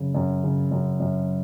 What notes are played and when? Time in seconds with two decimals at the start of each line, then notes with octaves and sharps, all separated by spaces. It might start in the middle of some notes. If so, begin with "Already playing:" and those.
Already playing: F#2 C#3
0.15 F#2
0.43 C#3
0.71 F#2
1.00 F#2